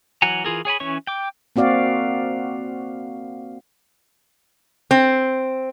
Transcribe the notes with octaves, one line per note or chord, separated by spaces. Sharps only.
E3 F#3 F#5 G#5 A#5
E3 F4 G#4 A#4
G#4 C#5 G#5 B5
E3 C#4 C#5 C#6
G5 D6
A#3 C4 F#4 D5 F5
C4